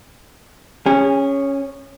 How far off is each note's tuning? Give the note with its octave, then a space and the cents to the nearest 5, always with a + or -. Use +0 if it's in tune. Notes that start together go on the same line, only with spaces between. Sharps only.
C#4 +0 G#4 -30